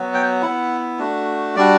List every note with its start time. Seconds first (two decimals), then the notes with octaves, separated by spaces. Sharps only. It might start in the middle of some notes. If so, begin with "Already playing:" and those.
Already playing: F#3 B3 F#4
0.14 G5
0.42 B3 E4 F#5
0.99 A3 D4 F#4
1.56 G3 D4 F#4 D5